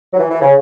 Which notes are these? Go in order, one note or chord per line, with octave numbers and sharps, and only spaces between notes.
F#3
E3
E3
C#3